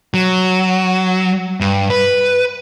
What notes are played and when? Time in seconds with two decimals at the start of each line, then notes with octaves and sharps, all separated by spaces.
0.14 F#3
1.61 G2
1.90 B4